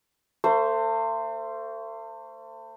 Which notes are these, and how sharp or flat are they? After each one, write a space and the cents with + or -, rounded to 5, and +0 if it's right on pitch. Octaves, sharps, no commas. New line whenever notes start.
A3 +40 C5 +0